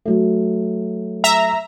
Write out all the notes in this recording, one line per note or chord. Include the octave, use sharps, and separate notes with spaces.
F#3 A3
E5 A#5